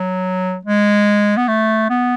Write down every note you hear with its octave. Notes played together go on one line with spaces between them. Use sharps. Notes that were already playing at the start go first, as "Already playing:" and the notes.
Already playing: F#3
G#3
B3
A3
B3